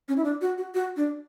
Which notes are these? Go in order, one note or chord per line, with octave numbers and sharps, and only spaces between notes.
C#4
E4
D4
F#4
F#4
F#4
D4